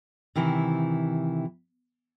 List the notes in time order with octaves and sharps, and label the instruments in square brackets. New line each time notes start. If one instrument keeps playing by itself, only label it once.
[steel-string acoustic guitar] C3 D#3 E3 E4